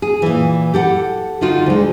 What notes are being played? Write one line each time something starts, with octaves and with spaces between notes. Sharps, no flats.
G#4
A#2 E3
G4 A4 F#5
D3 D#4 F4 F#4
D2 G#3